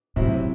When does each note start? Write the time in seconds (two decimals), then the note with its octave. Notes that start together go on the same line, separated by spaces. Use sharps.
0.16 A2 C3 F#3 C4 E4